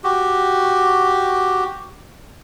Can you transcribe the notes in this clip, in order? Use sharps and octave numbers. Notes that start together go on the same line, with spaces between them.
F#4 G4